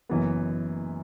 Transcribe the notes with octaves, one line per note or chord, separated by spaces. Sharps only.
F#1 F#2 E3 B3